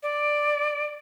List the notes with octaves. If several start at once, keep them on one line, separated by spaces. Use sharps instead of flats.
D5